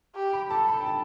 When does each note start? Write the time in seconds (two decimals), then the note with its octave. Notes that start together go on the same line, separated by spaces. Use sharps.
0.15 G4
0.33 B5
0.50 A4 A5
0.68 B5
0.81 G5
0.86 A5